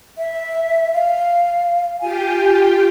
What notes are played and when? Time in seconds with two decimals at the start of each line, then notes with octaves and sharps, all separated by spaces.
0.18 E5
0.93 F5
2.01 F4 G4 G5 G#5